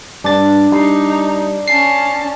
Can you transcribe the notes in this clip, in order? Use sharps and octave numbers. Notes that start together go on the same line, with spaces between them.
G2 D4 A6
G3 D#4 C6
C#4 A5 C7